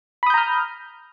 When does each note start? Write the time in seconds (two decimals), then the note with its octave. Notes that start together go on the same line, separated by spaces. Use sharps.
0.23 B5
0.26 D#6
0.30 G6
0.34 A#5
0.38 F6